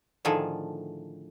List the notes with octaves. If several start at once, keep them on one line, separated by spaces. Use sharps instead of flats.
A2 D3 D#3 F3 G#4 A4